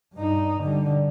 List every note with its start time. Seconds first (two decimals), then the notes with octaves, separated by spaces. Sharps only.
0.14 G2 D#4
0.61 D3 G3